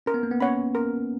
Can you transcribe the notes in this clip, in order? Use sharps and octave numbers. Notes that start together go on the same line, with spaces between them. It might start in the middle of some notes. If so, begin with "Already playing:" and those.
C#4 A#4
B3
A#3
B3
C#4 C#5 F#5 B5
A#4